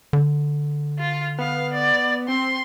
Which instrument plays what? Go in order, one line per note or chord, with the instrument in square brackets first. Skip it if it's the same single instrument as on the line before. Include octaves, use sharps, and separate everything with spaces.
[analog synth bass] D3
[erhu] F4
[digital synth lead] B3 [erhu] F5
[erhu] D5
[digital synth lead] C4 [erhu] C6